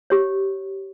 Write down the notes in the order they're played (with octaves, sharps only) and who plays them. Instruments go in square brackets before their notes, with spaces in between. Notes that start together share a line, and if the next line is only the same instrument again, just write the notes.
[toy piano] G4 C#5